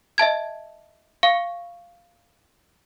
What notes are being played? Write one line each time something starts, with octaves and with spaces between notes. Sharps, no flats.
D#5 E5 A5 G#6
F5 C#6 C#7